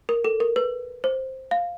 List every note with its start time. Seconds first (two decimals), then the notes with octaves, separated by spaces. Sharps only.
0.09 A#4
0.25 A4
0.40 A#4
0.56 B4
1.04 C5
1.51 F5